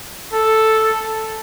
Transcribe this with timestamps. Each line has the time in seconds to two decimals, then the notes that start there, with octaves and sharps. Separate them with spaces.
0.32 A4